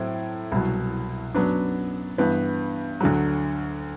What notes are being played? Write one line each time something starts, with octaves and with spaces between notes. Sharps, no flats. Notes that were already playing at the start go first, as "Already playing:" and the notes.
Already playing: A2 F#3 C4 E4
C2 B2 F#3
F#2 F#3 B3 D4
G2 E3 B3
D2 D3 F#3